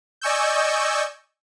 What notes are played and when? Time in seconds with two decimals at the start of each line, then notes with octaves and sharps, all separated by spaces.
0.21 D5 D#5 G#5 C#6 E6 G6